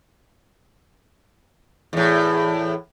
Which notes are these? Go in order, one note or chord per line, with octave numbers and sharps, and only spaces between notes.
E2 A2